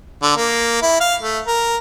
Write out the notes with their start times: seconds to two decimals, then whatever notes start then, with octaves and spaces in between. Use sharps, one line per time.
0.23 D3
0.37 A#3
0.82 E4
1.00 F5
1.21 A3
1.47 A#4